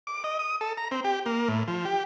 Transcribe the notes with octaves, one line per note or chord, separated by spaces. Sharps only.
D6
D#5
D#6
A4
A#5
C4
G4
A#3
A2
F3
G4